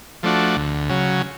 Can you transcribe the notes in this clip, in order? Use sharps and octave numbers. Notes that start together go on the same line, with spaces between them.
F3 A3 D4 F#4
D2
C#3 F#3